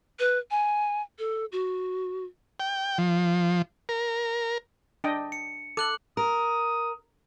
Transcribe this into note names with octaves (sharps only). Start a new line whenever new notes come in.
B4
G#5
A4
F#4
G5
F3
A#4
D4 D#5 G5
C#7
A4 D6 F#6 F#7
A#4 D#6